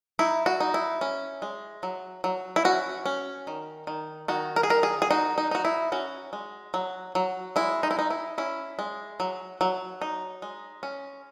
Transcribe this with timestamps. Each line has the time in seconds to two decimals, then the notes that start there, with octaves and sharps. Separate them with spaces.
0.19 D#4 E4
0.46 F#4
0.60 D#4
0.74 E4
1.01 C#4
1.42 G#3
1.83 F#3
2.24 F#3
2.56 E4
2.65 C#4 F#4
3.06 C#4
3.47 D#3
3.87 D#3
4.28 D#3 F#4
4.56 A#4
4.63 G#4
4.70 D#3 A#4
4.83 G#4
5.02 G#4
5.11 D#4 F#4
5.38 D#4
5.51 D#4 F#4
5.65 E4
5.92 C#4 F#4
6.33 G#3
6.74 F#3
7.15 F#3
7.56 G#3 E4
7.83 D#4
7.91 E4
7.97 G#3 D#4
8.10 E4
8.38 C#4 E4
8.79 G#3
9.20 F#3
9.61 F#3
10.02 D#4
10.42 G#3
10.83 C#4